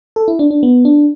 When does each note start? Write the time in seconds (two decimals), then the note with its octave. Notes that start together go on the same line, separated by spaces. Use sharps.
0.16 A4
0.28 E4
0.39 D4
0.51 D4
0.63 B3
0.85 D4